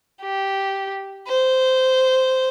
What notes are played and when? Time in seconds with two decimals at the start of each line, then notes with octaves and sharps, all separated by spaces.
0.22 G4
1.28 C5